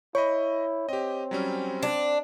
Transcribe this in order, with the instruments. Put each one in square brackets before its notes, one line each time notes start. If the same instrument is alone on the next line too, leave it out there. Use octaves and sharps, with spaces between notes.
[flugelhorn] E4 [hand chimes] C#5 [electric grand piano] D#5 B5 C#6
[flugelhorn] C4 [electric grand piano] G4 D#5
[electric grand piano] F#3 G3 C#4
[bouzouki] D4